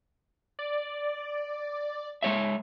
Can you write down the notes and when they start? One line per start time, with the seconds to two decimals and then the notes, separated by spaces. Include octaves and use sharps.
0.59 D5
2.23 G#3 C#5 E5